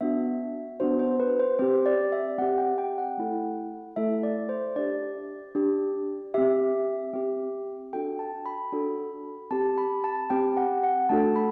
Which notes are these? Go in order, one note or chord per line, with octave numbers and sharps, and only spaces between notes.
B3 D4 F#4 E5
B3 D4 F#4 C5
C5
B4
C5
C4 G4 C5
D5
E5
C4 G4 F#5
G5
G5
F#5
A3 E4 A4
A3 E4 A4 E5
D5
C5
D4 G4 D5
D4 G4
C4 G4 E5
C4 G4
D4 F#4 A4 G5
A5
B5
D4 F#4 A4
C4 G4 A5
B5
A5
C4 G4 G5
F#5
F#5
A3 D4 F#4 A4 A5
B5